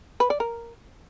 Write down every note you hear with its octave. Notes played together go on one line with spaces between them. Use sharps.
B4
D5
A#4